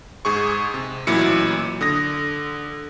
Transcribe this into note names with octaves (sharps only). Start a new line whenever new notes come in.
G#2 G#4 C#6
C3
A1 A#2 F#3 E4 C#7
D3 D#6 A#6